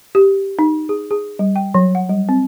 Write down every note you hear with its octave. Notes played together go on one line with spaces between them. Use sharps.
G4
D#4
G#4
G#4
G3
G5
F#3
F#5
G3
C4